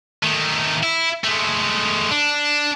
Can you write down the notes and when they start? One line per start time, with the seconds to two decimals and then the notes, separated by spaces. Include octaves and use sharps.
0.23 D#3 A3
0.83 E4
1.24 G#3 A3
2.11 D4